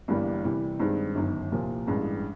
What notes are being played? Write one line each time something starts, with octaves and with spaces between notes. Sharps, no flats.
G1 G2 E3 G3 A#3
C3 E3 G3
G2 D#3 G#3 C4 D#4
G1 F#2 D#3
C2 A#2 F3 A#3
A1 G2 E3 G#3 C#4